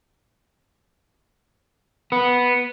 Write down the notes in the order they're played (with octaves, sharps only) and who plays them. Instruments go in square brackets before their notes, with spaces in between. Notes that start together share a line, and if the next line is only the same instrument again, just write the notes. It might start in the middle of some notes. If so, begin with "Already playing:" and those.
[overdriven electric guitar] B3